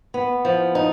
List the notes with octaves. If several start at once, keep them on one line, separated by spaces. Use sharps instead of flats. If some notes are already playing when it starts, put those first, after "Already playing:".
B3
F3
D#4